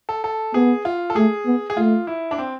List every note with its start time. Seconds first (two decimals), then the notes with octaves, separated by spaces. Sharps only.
0.09 A4
0.24 A4
0.54 B3 G#4
0.85 F4
1.10 A4
1.16 A3 G#4
1.46 B3
1.70 G#4
1.77 A3 F4
2.07 E4
2.31 D4
2.38 C4